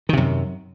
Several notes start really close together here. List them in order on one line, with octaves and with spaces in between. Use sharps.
D#3 C3 F#2